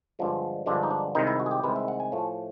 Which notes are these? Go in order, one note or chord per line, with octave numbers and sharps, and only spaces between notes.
G2 D3 F3 G#3
G2 D3 F3 G#3 D4
D#4
D4
C2 C3 D#3 G#3 D#4
E4
F#4
G#4
G4
C2 C3 D#3 G#3 B4
E5
F#5
G#5
A2 F3 A3